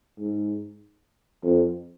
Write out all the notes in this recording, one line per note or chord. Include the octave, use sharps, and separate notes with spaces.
G#2
F2